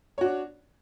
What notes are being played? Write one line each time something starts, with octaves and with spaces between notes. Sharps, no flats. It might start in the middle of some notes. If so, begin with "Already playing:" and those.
D4 F#4 C#5